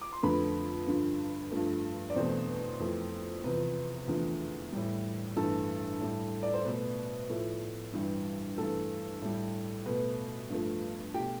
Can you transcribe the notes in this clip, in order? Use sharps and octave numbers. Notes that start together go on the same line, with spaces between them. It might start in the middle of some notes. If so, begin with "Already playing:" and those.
D6
C6
F2 D3 A3 B4 B5
G2 D3 F3
G2 F3 A3
D5
E2 B2 A3 C4 C5
F2 E3 A3
E2 C3 F3 B4
E2 D3 F3 A3
A2 G3
G2 E3 A3 A4
A2 G3
D5
C5
B2 A3 B4
A2 F3 A3
G2 E3 G3
G2 E3 A3 A4
A2 G3
B2 A3 B4
G2 F3 A3
B2 A3 G4 G5